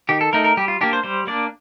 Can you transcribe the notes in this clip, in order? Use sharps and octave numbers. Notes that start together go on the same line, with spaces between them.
D#3 G4
A4
A3 D#4 A#4
A#4
G3 G4
F4
A#3 D4 G4
C5
G3 C5
A#3 D4 D5